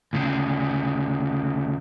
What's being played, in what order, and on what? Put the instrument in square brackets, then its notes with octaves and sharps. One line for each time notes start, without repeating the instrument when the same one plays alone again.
[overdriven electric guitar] D2 C#3